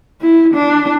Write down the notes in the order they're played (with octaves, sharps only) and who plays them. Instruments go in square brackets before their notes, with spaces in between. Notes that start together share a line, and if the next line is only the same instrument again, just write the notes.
[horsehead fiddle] E4
D4